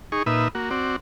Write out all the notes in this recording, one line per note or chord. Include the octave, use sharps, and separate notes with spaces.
D#4 G#4 C#6
A#2 D#4 B4 E5
A#3 F#4
C4 F#4 D5